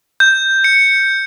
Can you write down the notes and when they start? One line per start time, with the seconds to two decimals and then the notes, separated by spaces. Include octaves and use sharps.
0.20 G6
0.64 C#7